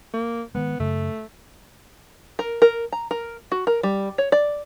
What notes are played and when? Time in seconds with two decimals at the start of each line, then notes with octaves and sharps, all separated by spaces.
0.14 A#3
0.55 D#3 G#3 B3
0.80 F#2 C#3 A3
2.39 A#4
2.62 A#4
2.92 A#5
3.11 A#4
3.52 F#4
3.67 A#4
3.83 G3
4.18 C#5
4.32 D5